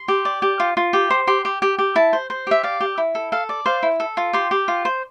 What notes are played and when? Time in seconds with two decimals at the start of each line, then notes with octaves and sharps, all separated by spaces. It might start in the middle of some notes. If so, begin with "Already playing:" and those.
Already playing: C6
0.08 G4
0.25 D5
0.42 G4
0.60 F4
0.77 F4
0.93 G4
1.10 C5
1.27 G4 C6
1.45 G4
1.62 G4
1.79 G4
1.96 E4 A5
2.13 C5
2.30 C5
2.47 G4 E5
2.63 D5 F5
2.81 G4
2.98 E4
3.15 A4
3.32 A4 F5
3.49 D5
3.66 C5 F5
3.83 E4
4.00 A4
4.17 F4
4.33 G4 C6
4.51 G4
4.68 F4
4.85 C5